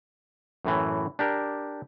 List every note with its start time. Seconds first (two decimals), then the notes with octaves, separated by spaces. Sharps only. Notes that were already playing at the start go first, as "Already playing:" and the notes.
0.65 F#2 A2 E3
1.19 D4 G4 A#4